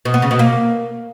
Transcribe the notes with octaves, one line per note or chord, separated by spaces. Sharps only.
B2
B3
C#3
B2
A#3